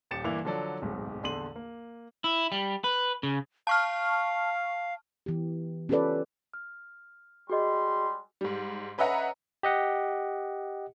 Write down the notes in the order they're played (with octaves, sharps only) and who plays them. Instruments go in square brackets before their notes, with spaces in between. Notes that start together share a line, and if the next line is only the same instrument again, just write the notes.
[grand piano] D#1 G4 A6 C#7 E7
G1 E3 A#3 E4 D6 F7
D3 F3 F#3 A4 D5
D1 B1 G#2
A#1 E2 D3 C6 D#7 F#7
A#3
[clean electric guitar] E4
G3
B4
C#3
[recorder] F5 [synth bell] A5 C#6 F6
[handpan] E3 B3 G4
C#4 F4 G4 A4 B4 D5
[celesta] F6
[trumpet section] G3 G#3 C6 [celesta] F#4 G#4 D#5
[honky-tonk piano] G#2 G3
C#4 B4 D#5 E5 F#5 A#5
[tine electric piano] G4 D#5 F#5